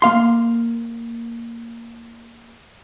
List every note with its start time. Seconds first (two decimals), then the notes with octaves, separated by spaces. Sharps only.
0.02 A#3 F5 C6